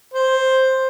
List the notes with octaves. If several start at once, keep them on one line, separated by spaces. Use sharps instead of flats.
C5